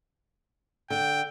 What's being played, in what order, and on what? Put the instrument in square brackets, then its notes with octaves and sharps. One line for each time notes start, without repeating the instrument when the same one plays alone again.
[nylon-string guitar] D3 [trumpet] G5